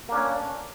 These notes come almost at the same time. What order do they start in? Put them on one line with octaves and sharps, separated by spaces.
A#3 D4 C#4